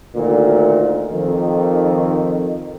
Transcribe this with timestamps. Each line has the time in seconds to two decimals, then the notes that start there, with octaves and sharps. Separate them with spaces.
0.15 D2 A#2 D#3
1.12 F2 D#3